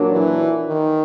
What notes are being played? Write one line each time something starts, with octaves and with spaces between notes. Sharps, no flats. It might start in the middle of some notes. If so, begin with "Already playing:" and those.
Already playing: A#2 F#3 A#3 D4
E3
D#3